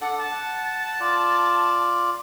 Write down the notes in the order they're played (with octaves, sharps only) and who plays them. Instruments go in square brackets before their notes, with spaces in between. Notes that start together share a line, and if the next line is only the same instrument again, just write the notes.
[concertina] D4 A4 D5 [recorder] F#5
[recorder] A5
[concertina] F#5
F4 D5